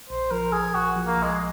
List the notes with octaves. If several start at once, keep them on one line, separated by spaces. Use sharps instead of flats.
A#1 C5
F3 A#4
A#1 G#4
A#1 F#4
F3
A#3
A#1
G#3